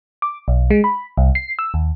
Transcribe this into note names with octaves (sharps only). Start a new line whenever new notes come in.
D6
B1
G#3
B5
C2
C7
E6
D#2